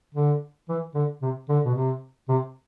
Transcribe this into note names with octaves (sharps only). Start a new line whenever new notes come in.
D3
E3
D3
C3
D3
B2
C3
C3